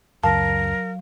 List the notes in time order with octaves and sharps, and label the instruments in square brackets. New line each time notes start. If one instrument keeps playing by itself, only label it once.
[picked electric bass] C#2 F#2 [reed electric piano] F#3 F5 [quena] A#4 [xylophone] A5